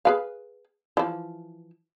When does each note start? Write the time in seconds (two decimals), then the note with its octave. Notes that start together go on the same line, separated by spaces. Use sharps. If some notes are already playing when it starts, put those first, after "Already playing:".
0.05 G#4 B4 F5
0.97 E3 F3